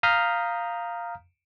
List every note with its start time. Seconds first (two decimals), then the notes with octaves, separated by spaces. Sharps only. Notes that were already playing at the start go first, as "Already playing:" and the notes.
0.03 F5 A#5 D#6 F6 G6 B6